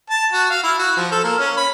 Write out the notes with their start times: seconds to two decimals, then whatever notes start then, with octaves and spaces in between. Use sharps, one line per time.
0.10 A5
0.32 F#4
0.50 F5
0.63 E4
0.79 F#4
0.97 F3
1.11 A4
1.24 A#3
1.39 C#4
1.57 B5